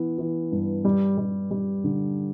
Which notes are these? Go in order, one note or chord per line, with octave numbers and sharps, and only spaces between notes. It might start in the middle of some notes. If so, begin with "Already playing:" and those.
Already playing: E3 B3
E3
G2
G3
G3
G3
D3